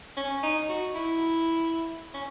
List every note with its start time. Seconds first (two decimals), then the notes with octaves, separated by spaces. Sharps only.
0.17 C#4
0.43 D#4
0.69 F#4
0.95 E4
2.14 C#4